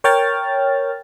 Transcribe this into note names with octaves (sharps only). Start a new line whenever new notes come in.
A#4 C#5 G5 F6 A6